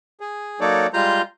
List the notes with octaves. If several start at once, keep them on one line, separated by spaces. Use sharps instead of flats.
G#4
F#3 A#3 D#4 A4 C#5 D5
G3 G#3 F4 A#5 C6 G6